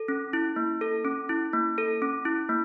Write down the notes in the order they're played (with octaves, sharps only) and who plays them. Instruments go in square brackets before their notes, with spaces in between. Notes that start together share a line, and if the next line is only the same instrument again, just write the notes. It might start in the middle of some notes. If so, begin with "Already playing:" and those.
Already playing: [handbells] A4
C#4
E4
A#3
A4
C#4
E4
A#3
A4
C#4
E4
A#3